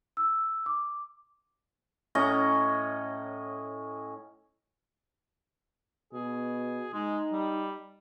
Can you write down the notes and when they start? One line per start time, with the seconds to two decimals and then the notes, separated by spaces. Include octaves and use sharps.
0.17 E6
0.66 D6
2.15 A2 C#4 D#5 A#5
6.13 B2 G#4
6.93 G#3 D#4
7.32 G3